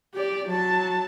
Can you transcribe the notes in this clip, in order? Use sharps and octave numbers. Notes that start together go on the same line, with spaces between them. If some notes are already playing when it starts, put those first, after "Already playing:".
G4 D5
F#3 A5